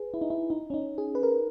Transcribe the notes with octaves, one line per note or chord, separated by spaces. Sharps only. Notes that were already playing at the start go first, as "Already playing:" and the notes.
Already playing: G#4 B4
E4
D#4
E4
D#4
C#4
D#4
G#4
B4
A#4